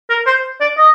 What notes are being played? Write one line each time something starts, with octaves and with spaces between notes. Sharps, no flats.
A#4
C5
D5
D#5